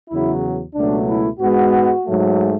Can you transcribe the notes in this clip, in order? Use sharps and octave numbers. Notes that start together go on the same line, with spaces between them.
E2 C#3 F#3 E4
C#2 B2 F#3 A3 D4
E4
G#2 G#3 B3 F#4
G#2 F#3 A3